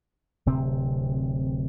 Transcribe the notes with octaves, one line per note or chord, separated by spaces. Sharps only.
D1 C3 C4